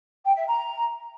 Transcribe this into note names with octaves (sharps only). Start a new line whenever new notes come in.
G5
E5
A#5